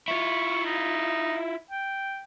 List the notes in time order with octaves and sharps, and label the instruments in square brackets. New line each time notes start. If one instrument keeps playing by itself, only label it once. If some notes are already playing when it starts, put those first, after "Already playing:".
[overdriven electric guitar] E4 F4 [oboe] C#6
[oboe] D#4
G5